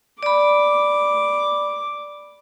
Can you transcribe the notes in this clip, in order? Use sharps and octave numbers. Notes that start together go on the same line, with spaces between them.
D5 B5 D6